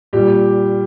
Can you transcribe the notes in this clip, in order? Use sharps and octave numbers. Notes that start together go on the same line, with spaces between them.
A#2 G3 G4